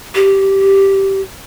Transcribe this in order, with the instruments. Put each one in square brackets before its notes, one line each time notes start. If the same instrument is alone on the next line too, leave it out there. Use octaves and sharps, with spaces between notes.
[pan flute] G4